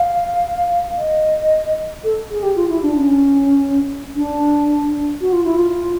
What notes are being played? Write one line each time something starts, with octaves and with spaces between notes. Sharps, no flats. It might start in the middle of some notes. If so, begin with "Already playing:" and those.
Already playing: F5
D#5
A4
G#4
G4
F4
E4
D4
C#4
D4
F#4
F4
E4
F4